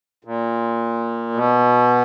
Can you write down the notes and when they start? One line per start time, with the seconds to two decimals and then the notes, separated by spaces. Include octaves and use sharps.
0.25 A#2
1.34 B2